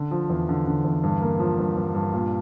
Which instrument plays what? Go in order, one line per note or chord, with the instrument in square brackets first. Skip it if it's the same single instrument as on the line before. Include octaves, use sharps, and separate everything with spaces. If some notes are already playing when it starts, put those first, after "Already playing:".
Already playing: [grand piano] D3
F3
E2
D3
D3
E2
G2
A#3
F3
G2
G2
G2
A#2